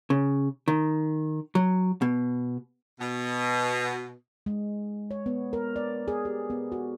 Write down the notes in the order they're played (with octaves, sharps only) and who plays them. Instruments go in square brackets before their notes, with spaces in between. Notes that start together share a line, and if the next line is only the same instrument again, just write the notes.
[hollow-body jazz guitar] C#3
D#3
F#3
B2
[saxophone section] B2
[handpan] G#3
C#5
B3
A#4
D5
G#4
G4
B3
F#4